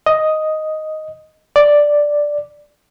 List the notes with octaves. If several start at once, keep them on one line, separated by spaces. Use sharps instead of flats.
D#5
D5